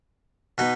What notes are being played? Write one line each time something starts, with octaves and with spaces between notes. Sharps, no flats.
B2 B3 D#4